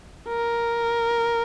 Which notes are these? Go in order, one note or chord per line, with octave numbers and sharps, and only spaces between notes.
A#4